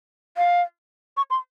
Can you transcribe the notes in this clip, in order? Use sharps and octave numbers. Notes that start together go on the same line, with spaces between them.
F5
C#6
C6